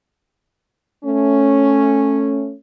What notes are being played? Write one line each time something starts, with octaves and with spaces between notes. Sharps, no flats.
A3 C#4